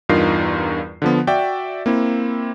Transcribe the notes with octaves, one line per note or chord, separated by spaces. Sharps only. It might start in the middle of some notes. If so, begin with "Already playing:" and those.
E2 G2 D#4 F4 A#4 C7
D3 F3 B3
F#4 D5 E5 G5
A#3 C4 E4